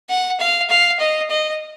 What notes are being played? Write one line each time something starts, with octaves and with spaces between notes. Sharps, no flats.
F#5
F5
F5
D#5
D#5